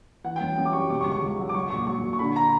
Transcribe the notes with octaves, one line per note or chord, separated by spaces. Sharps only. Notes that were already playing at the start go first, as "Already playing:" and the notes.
E3 F#5
G5
F#2
F#2
D6
G3 C#6
B2 D6
C#6
C#2
C#6
C#2
F#3
D6
F#3 C#6
A#2 C#6
F#3 C#6
A#2
C#6
D3 B5
A#5